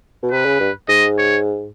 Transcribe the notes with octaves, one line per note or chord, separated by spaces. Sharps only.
B2
C3 B4
C#3
G2
G#2 D#5
C#5